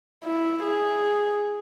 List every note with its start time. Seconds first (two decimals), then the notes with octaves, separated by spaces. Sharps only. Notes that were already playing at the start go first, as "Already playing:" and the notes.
0.24 E4
0.64 G#4